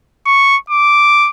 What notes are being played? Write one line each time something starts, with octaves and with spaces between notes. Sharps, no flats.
C#6
D6